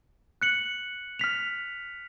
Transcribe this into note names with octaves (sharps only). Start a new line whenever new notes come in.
F#6 C#7 F#7
F6 B6 F7